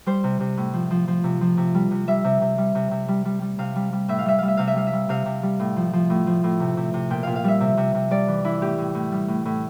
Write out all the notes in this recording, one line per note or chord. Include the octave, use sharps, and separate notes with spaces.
G3 C5
C3
C3
A2
F3
F3
F3
C3
F3
C3
G3
C3
G3 E5
C3
C3
G3
C3
C3
G3
G3
G3
C3 F5
G3
G3
A2 E5
F5
G3 E5
G3 F5
E5
C3 F5
E5
G3 F5
E5
G3
C3 F5
C3
G3
A2
F3
F3
A2
F3
A2
C3
C3
C3
A#2 G5
A#2 F5
F5
G3 E5
C3
C3
C3
G3 D5
E3
E3 E4
A2 G4
A2
A2
G3
A2
A2